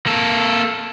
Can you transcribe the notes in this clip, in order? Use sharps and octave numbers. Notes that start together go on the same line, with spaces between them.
A#3 A4